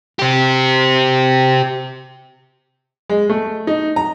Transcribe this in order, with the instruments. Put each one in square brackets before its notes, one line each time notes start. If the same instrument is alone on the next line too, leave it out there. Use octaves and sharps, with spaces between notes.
[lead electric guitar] G4 C5
[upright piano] G#3
A3
D#4
A#5